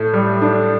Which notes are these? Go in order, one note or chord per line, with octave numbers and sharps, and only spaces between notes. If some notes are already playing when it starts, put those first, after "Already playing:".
Already playing: A2 A4
G3
D4